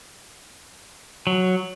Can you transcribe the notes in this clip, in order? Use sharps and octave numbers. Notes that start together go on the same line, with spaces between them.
F#3